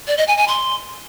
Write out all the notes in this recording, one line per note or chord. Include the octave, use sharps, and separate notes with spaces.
D5
D#5
G#5
G#5
C6